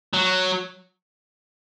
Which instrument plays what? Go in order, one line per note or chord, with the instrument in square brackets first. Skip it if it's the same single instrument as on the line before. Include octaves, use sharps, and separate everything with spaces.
[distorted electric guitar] F#3